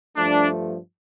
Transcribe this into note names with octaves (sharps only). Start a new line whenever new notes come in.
G2 F3 A3 D4